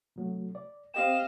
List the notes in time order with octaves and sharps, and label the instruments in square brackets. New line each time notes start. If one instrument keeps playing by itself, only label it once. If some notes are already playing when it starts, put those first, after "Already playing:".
[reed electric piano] C3 F#3 A3
D5
[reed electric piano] C4 G4 G5 [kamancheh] D#5 F5 [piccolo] E7